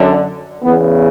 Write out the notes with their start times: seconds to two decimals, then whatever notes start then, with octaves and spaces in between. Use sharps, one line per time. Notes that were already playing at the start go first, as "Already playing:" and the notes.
Already playing: F#2 D3
0.62 E2 C#3 E3 B3